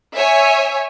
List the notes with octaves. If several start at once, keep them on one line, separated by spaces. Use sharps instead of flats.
C#5 E5 G#5